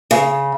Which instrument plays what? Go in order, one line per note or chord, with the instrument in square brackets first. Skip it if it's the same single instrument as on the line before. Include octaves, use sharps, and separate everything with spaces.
[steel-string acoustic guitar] C#3